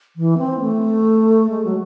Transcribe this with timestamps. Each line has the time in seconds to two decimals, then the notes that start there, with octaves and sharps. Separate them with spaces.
0.16 E3
0.38 C4
0.60 A3
1.50 G#3
1.64 F#3